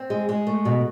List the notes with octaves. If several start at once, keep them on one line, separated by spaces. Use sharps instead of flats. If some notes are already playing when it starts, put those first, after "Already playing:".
Already playing: C4
G#3
G#3
A3
B2